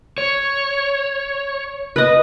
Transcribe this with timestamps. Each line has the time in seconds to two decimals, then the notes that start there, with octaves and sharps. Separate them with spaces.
0.18 C#5
1.96 B4 D#5